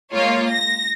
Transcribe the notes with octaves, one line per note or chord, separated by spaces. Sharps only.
G#3 A#3 F4 C#5
A#6